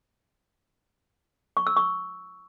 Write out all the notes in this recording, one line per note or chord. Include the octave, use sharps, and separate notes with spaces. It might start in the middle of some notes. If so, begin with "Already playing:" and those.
C#6
E6
C#6